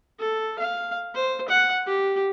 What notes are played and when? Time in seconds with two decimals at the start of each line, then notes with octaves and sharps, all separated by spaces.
0.19 A4
0.59 F5
1.15 C5
1.49 F#5
1.87 G4